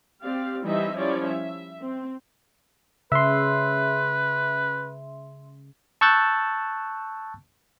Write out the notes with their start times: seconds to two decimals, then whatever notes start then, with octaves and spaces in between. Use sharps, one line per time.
0.22 C4 G4 D5 F5
0.64 E3 G3 C4 D#4 D#5 E5
0.96 F3 G3 C#4 E4 C#5 D5
1.26 E5
1.81 C4
3.12 C#3 B4 E5 C6
6.01 A5 C#6 E6 F#6 G6 A6